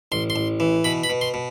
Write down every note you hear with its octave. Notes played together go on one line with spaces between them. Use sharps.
A1 C6
C6
A1
E3
B2 B5
B5
B2
C6
B2